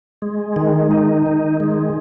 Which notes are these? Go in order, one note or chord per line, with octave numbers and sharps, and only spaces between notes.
G#3
D#3
D#4
D#3
G#3